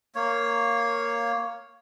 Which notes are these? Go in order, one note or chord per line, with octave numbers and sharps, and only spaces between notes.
A#3 C#5